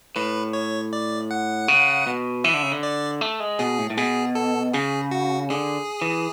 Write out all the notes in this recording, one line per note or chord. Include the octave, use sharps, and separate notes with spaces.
A2 B4
C#5
D5
F#5
C#3
B2
E3 E5
D3
C#3
D3
D5
A3
G#3
B2 G#4
A2
A2
B2 G#4
A4
C#3 G#4
F#4
D3 G#4
E3